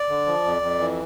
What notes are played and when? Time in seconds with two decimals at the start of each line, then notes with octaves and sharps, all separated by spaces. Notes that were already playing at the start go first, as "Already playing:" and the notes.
Already playing: D5
0.09 D3
0.26 F3
0.44 F2
0.62 F2
0.80 E3